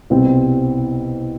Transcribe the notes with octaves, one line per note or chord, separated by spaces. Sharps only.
C2 B2 G3 C4